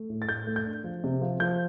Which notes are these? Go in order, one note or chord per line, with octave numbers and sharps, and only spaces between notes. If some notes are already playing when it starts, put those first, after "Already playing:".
Already playing: A3
A2
A6
A2 G6
A3
G6
D4
F3
C3
F3
F3 G6